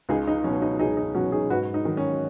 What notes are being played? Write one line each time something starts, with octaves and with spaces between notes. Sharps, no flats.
C#2 D#4 G#4
D#4
B2 F#3 C#4
D#4
C#2 D#4 G#4
D#4
B2 F#3 C#4 F#4
D#4 G#4
G#2 F#4 B4
D#4
D#3 F#3
C#4